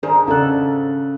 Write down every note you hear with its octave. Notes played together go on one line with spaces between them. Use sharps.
G#2 D#3 D4 G#4 A#4 C5
C#3 D4 A4 F#5 F#6